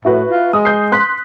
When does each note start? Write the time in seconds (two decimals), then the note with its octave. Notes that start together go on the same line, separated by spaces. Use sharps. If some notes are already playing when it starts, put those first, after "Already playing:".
0.05 A2 E4 F#4 B4
0.30 F4
0.53 G#3 D#6
0.65 G6 C7
0.92 C6 F#6 B6